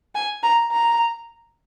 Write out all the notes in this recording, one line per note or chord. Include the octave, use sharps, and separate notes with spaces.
G#5
A#5
A#5